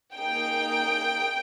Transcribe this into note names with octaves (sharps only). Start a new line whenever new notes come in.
A#3 D#4 G#4 G5